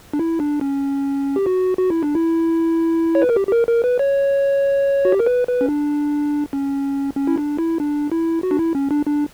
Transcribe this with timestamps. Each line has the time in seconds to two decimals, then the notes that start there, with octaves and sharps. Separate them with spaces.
0.14 D4
0.19 E4
0.40 D4
0.61 C#4
1.36 G4
1.46 F#4
1.78 F#4
1.90 E4
2.03 D4
2.15 E4
3.15 C#5
3.22 B4
3.29 A#4
3.36 G4
3.47 G4
3.52 A#4
3.68 A#4
3.84 B4
3.99 C#5
5.05 F#4
5.12 G4
5.19 A#4
5.26 B4
5.48 B4
5.61 C#4
5.69 D4
6.53 C#4
7.16 C#4
7.27 E4
7.38 D4
7.59 E4
7.80 D4
8.12 E4
8.43 F#4
8.51 D4
8.59 E4
8.75 C#4
8.91 D4
9.06 D4